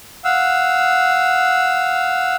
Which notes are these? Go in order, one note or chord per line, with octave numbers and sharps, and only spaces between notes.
F5 F#5 E6